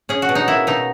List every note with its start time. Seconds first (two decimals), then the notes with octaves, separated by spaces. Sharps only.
0.09 C#4 G#4
0.22 F#4
0.29 B2
0.35 D#4
0.48 A#3 E4
0.67 B2 D#4